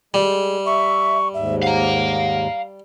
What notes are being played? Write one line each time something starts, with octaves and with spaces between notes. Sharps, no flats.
G3 G#3
E5 C#6
D#2 G#2 E5
F5 F#5 A#5